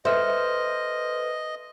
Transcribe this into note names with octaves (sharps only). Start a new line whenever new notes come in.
A4 B4 C5 D#5 E5 C6 F6